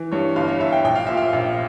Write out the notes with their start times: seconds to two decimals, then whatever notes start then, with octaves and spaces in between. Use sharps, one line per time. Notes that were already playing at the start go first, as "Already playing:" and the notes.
Already playing: E3
0.12 G2 C#5
0.36 G1 F5
0.48 C#5
0.60 G1 E5
0.72 G5
0.84 A#1 G5
0.95 F5
1.07 A#2 E5
1.17 F5
1.33 A#1